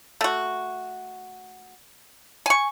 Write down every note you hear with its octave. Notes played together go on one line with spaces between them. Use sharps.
A3 F#4
G#5 C#6